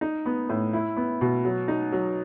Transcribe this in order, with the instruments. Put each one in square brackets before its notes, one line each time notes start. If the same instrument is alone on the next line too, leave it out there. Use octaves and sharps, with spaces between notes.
[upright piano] D#4
B3
A2
E4
B3
B2
F#3
D#4
F#3